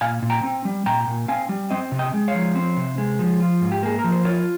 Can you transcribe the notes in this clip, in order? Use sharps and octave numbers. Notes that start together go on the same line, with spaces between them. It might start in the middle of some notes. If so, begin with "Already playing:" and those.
A#2 F5 G#5
A#2
G5 A#5
C4
G3
A#2 G5 A#5
A#2
C4 F5 G#5
G3
C4 D#5 G5
C3
D#5 G5
G#3
C#5 F5
F3
C4
C3
G#3
F3
F4
G#2
G4
A#3 G#4
A#4
F3
C5
F4 A#4 C#5